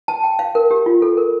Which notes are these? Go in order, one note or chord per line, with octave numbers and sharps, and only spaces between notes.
A5
G5
F5
A#4
G4
F4
A4
A#4